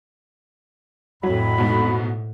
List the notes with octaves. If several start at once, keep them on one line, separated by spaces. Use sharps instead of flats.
F2 A2 F#3 B5
G#2 B2